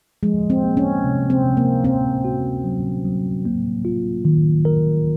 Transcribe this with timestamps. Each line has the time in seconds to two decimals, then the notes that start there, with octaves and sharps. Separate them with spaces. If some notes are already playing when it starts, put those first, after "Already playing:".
0.23 F3 G#3
0.50 C4
0.64 A#3
0.77 C#4
1.04 C3
1.30 C4
1.44 C3
1.57 A#3
1.84 C4 C#4
2.25 F#4
2.64 F#3
3.05 F#3
3.45 A#3
3.85 F4
4.25 D#3
4.65 A#4